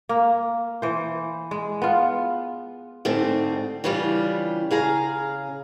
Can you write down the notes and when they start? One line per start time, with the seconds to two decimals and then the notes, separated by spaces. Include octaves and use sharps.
0.09 A#3
0.82 E3 C5
1.51 G#3
1.82 B3 F4
3.05 G#2 D3 A3 C4
3.84 C#3 E3 G3 D4 F4
4.71 C#3 G#4 F5 A#5